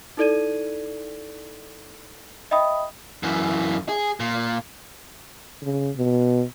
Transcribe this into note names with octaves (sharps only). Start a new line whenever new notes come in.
D#4 E4 A4 D5 G#6 D#7
D#5 E5 G5 B5 D#6
F#2 E3
G#4
A#2
C#3
B2